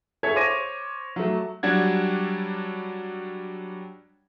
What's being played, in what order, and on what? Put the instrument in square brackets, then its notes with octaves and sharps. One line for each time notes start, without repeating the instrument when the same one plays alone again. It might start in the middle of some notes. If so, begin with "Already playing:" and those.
[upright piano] G#4 A4 C#5 E5 C#6 G#6
C5 C#5 D6 A#6 D#7
F#3 A3
[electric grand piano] F#3 G3 D4 F#5 G#6